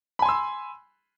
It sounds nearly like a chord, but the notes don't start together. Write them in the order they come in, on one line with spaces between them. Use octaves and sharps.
B5 G#5 C6 E6